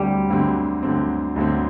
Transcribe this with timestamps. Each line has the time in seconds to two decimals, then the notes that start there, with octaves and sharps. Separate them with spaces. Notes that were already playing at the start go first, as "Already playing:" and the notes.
Already playing: D2 D3 F#3 G3 C4
0.29 D2 D3 F#3 C4
0.83 D2 D3 F#3 C4
1.36 D2 D3 F#3 C4